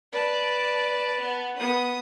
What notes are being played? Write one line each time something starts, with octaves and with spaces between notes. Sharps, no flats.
B4 D5 A5
B3
B3 D#6